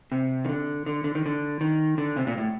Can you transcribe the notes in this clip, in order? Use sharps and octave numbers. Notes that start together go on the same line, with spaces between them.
C3
D#3
D3
D3
D3
D#3
D3
D#3
D3
C3
A#2
A2